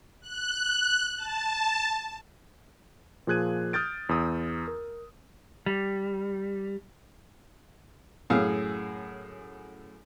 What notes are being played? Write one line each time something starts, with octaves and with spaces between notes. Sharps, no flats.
F#6
A5
A#2 F3 G#4 F#6 G#6 D#7
D#6 F6 G6 A6 D7
E2 D#6 E6
A#4
G3
F#2 A2 G#4 F5 E6